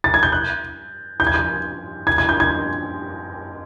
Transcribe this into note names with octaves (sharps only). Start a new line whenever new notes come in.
A6
G#6
G6
F#6
G6
G#6
G6
G#6
G#6
G6
G#6